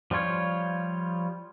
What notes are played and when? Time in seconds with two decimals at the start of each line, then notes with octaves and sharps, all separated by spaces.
0.11 F3 G3 F4 C#5